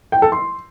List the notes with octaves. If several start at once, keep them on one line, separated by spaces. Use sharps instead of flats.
G5
A4
C6